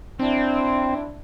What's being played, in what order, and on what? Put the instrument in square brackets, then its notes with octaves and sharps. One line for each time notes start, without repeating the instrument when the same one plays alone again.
[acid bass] C4 [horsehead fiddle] D4 E4